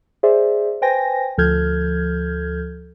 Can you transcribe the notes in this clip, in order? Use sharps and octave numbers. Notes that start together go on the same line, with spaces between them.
G#4 C5 D5 E5
B4 C5 G5 G#5 A#6
D2 F3 A4 F6 G6 G#6